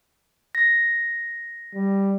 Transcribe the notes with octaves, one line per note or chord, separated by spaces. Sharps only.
A#6
G3